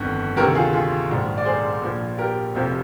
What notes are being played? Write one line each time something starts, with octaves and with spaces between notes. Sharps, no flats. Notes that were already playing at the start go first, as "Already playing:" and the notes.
Already playing: G1 F2 D#3
D2 C3 D#3 G4 A#4
F4 G#4
F4 G#4
A#1 G#2 D#3
D5
G#4 C5
A#1 A#2 F3
G4 A#4
F1 F2 C3 F3